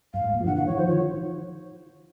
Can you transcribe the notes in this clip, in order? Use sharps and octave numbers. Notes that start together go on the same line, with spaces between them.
G2 F5
G#2
A#2
F3
D3 E3 F#5
F#5
C#5
D#3 F3 C5
C#5